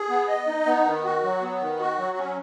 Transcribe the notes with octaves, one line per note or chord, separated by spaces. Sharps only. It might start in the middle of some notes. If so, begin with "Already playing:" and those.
Already playing: G#4
B3
D#5
D#4
B3
D#3
F#4
F#3
B3
D#3
F#4
F#3
C#4